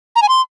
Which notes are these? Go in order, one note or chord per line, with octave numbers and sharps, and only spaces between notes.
A#5
G#5
C6